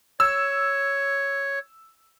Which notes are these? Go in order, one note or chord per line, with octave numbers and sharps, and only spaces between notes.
C#5 E6